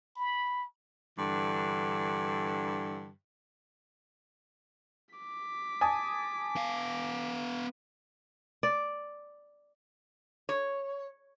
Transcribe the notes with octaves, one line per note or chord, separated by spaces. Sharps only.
B5
G2 D3 E3
D6 B6
G#5 A5 D#6
B3 F5
D5
C#5